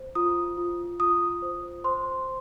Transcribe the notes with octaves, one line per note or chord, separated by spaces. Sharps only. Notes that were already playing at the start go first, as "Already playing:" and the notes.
Already playing: C5
F4 D#6
F4
F4 D#6
C5
C5 C6